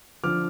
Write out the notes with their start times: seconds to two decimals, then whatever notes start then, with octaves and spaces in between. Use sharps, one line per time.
0.24 D3 F3 D6 F6